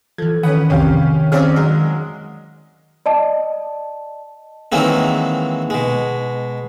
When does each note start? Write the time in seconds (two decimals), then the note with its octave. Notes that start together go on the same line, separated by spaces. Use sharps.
0.18 E3 F3 A4 G#6
0.43 D#3 C#4 B4 F#5 B5 D#6
0.70 B1 F2 C3 C#4 G4 F5
1.32 D#3 C4 C#4 G#4 D5 F5 F6
1.56 F#3 G#3 D#5
3.06 D5 D#5 A5
4.72 D#3 E3 F#3 G#3 A#3 C4
5.70 B2 G#3